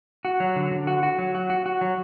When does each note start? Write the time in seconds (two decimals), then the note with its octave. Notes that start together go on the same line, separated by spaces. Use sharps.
0.25 F#4
0.40 F#3
0.56 D3
0.71 D3
0.87 F#4
1.03 F#4
1.18 F#3
1.35 F#4
1.50 F#4
1.66 F#4
1.81 F#3